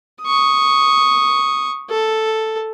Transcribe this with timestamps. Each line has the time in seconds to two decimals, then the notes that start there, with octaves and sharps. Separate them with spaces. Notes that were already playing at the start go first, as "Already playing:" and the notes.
0.23 C#6 D#6
1.90 A4